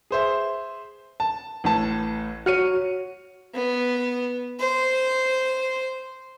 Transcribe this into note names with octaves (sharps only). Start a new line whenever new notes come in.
G#4 C5 E5
A5
A1 A2 A5
F#4 C#5 F6 C#7 D#7
B3
C5